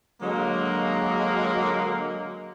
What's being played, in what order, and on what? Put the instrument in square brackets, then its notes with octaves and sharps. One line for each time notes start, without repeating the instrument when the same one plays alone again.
[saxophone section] D3 F#3 G#3 [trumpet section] A#3